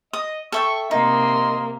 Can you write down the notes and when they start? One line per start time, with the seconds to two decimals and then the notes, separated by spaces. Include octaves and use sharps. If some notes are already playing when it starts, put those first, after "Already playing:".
0.13 D#5 D#6
0.52 A4 E5 G5 C#6
0.91 C3 A#3 D#4 D#5 C6